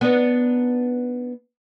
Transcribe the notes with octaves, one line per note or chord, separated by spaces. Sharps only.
B3 D4 D#4